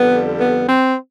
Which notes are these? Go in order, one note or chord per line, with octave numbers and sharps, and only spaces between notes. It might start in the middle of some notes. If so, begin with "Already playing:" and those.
Already playing: F2 D3 G3 B3
B3
C4